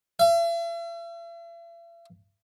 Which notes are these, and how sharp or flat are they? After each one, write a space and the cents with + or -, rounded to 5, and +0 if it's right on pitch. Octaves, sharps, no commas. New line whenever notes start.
E5 +45